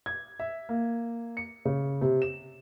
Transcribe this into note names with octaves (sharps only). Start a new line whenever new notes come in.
G#6
E5
A#3
C#7
C#3
C3
E7